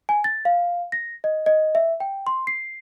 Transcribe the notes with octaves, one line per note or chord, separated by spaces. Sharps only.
G#5
A6
F5
A#6
D#5
D#5
E5
G5
C6
C7